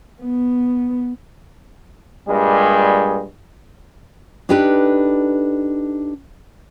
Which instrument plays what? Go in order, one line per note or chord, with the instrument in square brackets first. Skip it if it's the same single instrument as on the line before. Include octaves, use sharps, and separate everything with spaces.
[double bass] B3
[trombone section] G2 A#2 G3 G#3
[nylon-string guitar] D4 D#4 G4 A4 B4